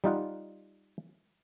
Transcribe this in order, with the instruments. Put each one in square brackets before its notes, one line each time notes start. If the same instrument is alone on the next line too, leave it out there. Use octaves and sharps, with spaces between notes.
[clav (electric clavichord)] G3 D#4 F4 F#5